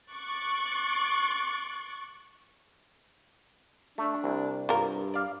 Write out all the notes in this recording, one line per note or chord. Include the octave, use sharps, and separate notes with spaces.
C#6 D6 F#6 A6
A3 D4
C2
G2 F4 A#4
D5 F5